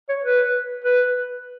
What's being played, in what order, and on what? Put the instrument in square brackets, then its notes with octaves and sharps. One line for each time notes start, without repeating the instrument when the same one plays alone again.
[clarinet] C#5
B4
B4